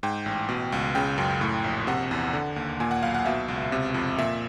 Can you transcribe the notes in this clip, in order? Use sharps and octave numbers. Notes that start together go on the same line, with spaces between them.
G#2 G5
A1
B2
C#2
C#3 G5
F#2
A2
A#1
C3 F#5
E2
D3
D#2
A#2 G#5
F#5
B1 F5
F#5
B2 E5
C#2
C3
F2
A#2 E5